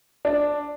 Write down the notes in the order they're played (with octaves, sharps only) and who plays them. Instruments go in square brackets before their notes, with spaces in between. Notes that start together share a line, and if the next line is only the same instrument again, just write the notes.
[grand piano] D4